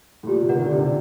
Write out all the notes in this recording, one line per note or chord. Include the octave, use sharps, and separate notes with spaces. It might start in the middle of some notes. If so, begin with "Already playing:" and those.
A2
A#2 G4
C3
A#4 D5 F#5
D#3
D3
C3 G4
D3